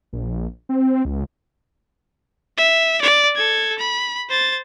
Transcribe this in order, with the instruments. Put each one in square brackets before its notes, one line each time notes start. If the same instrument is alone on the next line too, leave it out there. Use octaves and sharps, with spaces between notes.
[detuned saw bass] A#1
C4
C#2
[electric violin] E5
D5
A4 G#6
B5
C5 A6